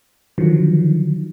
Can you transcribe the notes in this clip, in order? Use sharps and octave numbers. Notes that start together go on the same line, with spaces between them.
D3 D#3 F3 F#3